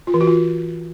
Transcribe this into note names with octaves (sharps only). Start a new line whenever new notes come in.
F4
E3
F#4
F4